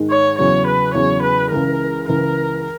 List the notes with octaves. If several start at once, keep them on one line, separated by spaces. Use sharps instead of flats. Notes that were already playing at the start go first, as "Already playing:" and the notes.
Already playing: G#2 D#3 G#3
C#5
E2 C#3 F#3 C#5
B4
E2 C#3 F#3 C#5
B4
C#2 C#3 E3 A#4
C#2 C#3 E3 A#4